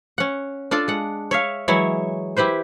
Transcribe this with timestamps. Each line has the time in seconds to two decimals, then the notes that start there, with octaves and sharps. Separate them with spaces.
0.18 C#4 F#5
0.71 D4 F4 A4 D5
0.88 G#3 F#5
1.31 C#5 E5 F5
1.68 E3 F#3 G#3 E4 C#5
2.37 E4 G4 B4 C5